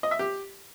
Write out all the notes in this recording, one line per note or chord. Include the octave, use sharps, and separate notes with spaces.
D#5
E5
G4